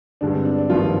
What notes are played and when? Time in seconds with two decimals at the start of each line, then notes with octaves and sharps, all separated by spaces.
0.21 G2 D3 G#3 D4
0.34 C4
0.45 D4
0.58 D4
0.70 G#1 G2 F3 A#3 F4